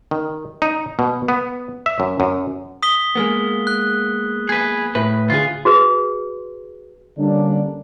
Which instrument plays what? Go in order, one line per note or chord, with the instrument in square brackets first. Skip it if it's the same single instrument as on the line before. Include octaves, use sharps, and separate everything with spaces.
[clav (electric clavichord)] D#3
D#4
B2
B3
E5
F#2
F#2
[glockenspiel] D#6 B6 G7
[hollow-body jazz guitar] G#3 A#3 B3
[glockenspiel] F#6
[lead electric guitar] G#4 B4
[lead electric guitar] A2 [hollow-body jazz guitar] B4
[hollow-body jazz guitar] D2 D3 G#4 [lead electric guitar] F4
[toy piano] F#4 G#4 B4
[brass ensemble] D3 G3 A#3 C#4 D4